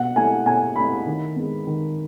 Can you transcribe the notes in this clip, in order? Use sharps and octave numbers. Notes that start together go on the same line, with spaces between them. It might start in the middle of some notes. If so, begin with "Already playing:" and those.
Already playing: B2 F#5
A3 E4 G#5
B2 G#5
A3 E4 B5
D#3
G#3 B3
D#3